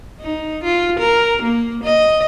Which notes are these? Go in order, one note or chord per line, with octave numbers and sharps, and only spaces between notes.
D#4
F4
A#4
A#3
D#5